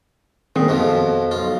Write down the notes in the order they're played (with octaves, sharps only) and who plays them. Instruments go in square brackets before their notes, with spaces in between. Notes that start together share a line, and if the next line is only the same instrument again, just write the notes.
[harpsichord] A#2 [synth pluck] D#3 C4 G#4
[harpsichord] F2 B2 F3
B1 F4